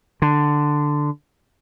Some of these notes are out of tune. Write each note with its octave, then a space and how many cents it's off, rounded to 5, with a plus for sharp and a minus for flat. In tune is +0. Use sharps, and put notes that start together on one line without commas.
D3 +5